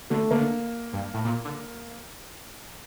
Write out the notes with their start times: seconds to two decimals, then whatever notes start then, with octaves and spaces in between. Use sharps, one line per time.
0.10 D3 A3
0.31 D3 A#3
0.93 G2
1.14 A2
1.25 A#2
1.45 D3